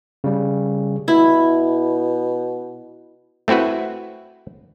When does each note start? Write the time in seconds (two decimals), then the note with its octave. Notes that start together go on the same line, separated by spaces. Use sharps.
0.24 C#3 G3
1.08 B2 E4
3.48 A3 C4 E4 F#4 B4